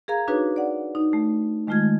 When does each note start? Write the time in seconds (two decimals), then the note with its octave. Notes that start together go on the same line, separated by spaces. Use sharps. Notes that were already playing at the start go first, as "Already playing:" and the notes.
0.08 G#4 A#4 F5 A#5 G#6
0.28 D4 D#4 F#4 G#4 B4 C#5
0.56 D5 F#5
0.95 D#4
1.13 A3
1.67 D#3 G#3 A3 F4 F6 G#6